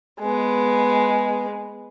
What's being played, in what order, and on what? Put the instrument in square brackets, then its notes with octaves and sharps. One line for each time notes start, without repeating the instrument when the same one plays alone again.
[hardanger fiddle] G#3 B3